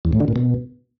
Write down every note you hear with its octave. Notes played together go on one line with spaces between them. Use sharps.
E2
A2
D3
A#2
B2